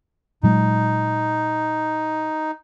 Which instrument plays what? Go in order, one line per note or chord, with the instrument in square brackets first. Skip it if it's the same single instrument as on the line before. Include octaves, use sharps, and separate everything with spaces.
[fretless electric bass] A#2 F#3 G#3 [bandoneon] D#4